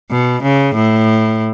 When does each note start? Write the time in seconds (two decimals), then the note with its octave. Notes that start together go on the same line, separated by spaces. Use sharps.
0.11 B2
0.43 C#3
0.75 A2